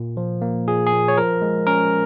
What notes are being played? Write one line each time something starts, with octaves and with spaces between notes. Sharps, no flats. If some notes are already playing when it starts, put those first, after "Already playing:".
Already playing: A#2
F3
A#3
A#2 G#4
G#4
A#2
C#5
F3 A#4
G#3
C#4 A#4